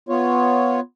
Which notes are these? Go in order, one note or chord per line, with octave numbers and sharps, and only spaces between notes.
B3 F4 C#5